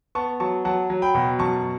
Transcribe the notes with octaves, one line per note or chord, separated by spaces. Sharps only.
B3 A5 C#6
F#3 A5 C#6
F#3 F#5 A5
F#3
G5 B5
B2
F#2 A5 C#6